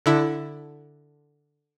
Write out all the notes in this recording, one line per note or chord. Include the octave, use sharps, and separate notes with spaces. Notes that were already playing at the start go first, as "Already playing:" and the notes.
D3 E4